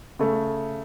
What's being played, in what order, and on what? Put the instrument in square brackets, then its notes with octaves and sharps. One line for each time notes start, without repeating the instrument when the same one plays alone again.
[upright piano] C#3 A3